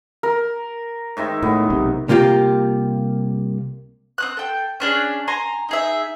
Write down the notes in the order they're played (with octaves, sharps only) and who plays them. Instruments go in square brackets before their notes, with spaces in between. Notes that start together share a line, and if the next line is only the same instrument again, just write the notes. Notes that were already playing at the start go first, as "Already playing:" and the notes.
[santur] A#4
[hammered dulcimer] G#2 D#3 E5
[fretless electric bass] A2 [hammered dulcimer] B3
[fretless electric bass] B1 C3
[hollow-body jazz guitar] C2 C3 A#3 F4 G4
[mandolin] C4 D#6 F#6
A4 G5
C#4 D4 G#4
G#5 A#5 C6
D#4 G#4 E5